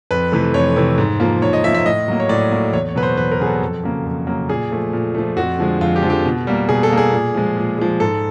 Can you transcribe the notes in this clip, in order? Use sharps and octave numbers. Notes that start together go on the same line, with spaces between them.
F2 B4
C3 E3 A3
F2 C#5
C3 E3 A3
G#2
F3 A#3
G#2 C#5
D#5
F3 A#3 E5
E5
A2 D#5
F#3 A#3
C#5
A2 D5
F#3 A#3
E2 C#5
C#5
B2 F#3 B4
C5
E2 B4
A#4
B2 F#3 G#4
A4
F2
C#3 F#3 A#3
F2
C#3 F#3 A#3
A#2 G#4
F3 A3
A#2
F3 A3
F2 F#4
D3 F3 G#3
F2 F4
G4
D3 F3 G#3
G4
B2
G3 A#3
B2 G#4
A4
G3 A#3
G#4
A#2
F3 G#3
A#2
F3 G#3
G#2 A4